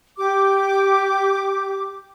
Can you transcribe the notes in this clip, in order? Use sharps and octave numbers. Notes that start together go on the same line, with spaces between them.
G4 D6